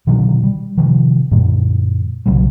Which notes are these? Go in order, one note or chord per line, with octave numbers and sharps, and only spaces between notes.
B2 D3 D#3 F#3
G3
C3 D#3 F3 G3
F#2 A#2 D3 G3
B1 C#3 F#3 G3